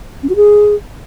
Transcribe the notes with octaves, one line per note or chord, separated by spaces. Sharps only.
C#4
F#4
G#4